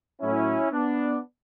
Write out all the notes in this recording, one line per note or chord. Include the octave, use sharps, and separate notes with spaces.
A2 F#3 C#4 E4
B3 D4